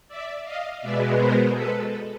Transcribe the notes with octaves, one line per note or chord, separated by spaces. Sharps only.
D5 E5
D#5 F5
B2 G#3 B3 D5 E5
A#4 C5
A4 B4